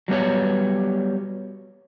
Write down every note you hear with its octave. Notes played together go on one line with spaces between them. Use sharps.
F#3 G3 B3 G4 C#5